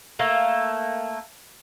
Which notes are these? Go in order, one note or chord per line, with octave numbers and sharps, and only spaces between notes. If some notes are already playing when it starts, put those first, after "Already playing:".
A3 A#3 A4 A#4